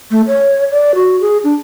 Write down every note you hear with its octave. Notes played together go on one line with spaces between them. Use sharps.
A3
C#5
D5
F#4
G#4
D4